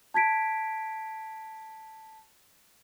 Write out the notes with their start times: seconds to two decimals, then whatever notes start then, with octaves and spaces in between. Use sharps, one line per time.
0.14 A5 G#6 B6 D7